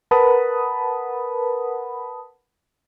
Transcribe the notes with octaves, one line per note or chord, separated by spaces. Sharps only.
A#4 B4 F#5 A5 B5 D#6